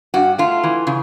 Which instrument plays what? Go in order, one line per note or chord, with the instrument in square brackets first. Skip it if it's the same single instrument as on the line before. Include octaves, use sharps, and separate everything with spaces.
[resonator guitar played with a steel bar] G2 F#4
A3 F4
E3
C#3